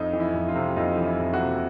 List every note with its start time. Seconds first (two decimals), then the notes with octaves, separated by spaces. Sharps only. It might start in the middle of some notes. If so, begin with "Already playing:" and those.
Already playing: F2 D#4
0.13 E3
0.20 E4
0.34 F2
0.48 F4
0.55 C3
0.76 F2 D#4
0.97 E3
1.05 E4
1.19 F2
1.34 F#4
1.40 C3